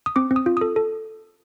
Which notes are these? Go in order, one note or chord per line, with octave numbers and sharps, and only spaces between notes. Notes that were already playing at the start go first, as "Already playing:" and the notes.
D#6
C4 D6
C4
D#6
F4
A4 D#6
A4